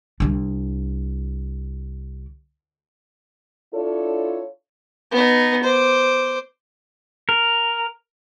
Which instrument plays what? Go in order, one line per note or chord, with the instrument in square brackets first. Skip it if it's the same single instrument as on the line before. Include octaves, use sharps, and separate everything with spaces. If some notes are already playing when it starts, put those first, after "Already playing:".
[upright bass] C2 D4
[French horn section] D4 E4 F4 A4 C#5
[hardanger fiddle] B3 D#4
C5 D6
[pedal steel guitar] A#4